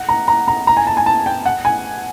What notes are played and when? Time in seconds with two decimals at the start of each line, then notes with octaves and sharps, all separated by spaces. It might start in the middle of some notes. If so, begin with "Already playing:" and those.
Already playing: F#5
0.09 A#5
0.28 A#5
0.48 A#5
0.67 A#5
0.77 G#5
0.87 A5
0.97 G#5
1.06 A5
1.26 G5
1.46 F#5
1.65 G#5